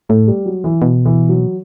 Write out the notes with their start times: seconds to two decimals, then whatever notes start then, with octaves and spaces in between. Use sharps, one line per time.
0.09 A2 A3
0.28 G3
0.46 F#3
0.64 E3
0.82 B2
1.05 E3
1.29 F#3